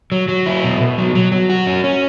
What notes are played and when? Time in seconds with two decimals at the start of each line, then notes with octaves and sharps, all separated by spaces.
0.12 F#3
0.28 F#3
0.46 E4
0.64 B2
0.80 B2
0.98 F#3
1.15 F#3
1.32 F#3
1.50 F#4
1.67 C#4
1.84 C#4